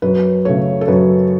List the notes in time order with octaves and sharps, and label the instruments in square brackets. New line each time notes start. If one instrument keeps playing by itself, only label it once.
[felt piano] F#2 B4
C#3 A3 C#5
A4
F#2 B4